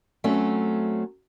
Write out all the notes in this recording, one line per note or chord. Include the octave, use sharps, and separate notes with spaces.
F#3 A3 C4 C#4